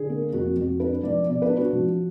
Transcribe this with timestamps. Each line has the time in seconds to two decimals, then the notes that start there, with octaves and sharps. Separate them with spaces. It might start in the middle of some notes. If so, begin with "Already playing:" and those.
Already playing: D3 G#4
0.09 A#3
0.33 F2 F#4
0.56 F2 F#4
0.80 D4 B4
1.03 F3 D5
1.26 B2 D5
1.42 B4
1.49 D4
1.57 F#4
1.73 F3